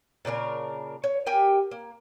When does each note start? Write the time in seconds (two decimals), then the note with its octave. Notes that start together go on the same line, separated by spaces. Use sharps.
0.25 A#2 C#3 D4 A#4
1.04 C#5
1.26 G4 A#4 G5 G#5
1.71 A#3